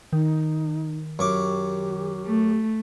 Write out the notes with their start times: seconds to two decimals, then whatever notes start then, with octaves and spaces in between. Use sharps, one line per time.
0.13 D#3 D#4
1.19 F#2 G4 C#6 D6
2.25 A3